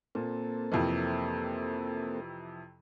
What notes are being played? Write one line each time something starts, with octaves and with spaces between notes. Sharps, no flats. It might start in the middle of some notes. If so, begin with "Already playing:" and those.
A#2 A#3 C4 A4
F2 C3 E3